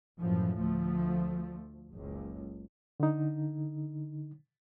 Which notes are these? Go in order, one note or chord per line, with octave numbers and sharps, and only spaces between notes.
F#2 A2 E3 F3
D2 F3 A3
F#1 C#2
D3 D#4